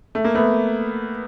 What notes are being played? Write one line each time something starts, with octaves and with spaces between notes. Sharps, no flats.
A3
A#3
A3 B3